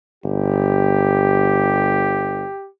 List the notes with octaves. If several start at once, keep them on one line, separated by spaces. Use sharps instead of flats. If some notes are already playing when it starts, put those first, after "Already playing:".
G1 G4